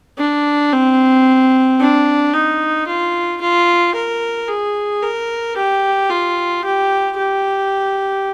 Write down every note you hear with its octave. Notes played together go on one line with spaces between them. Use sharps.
D4
C4
D4
D#4
F4
F4
A#4
G#4
A#4
G4
F4
G4
G4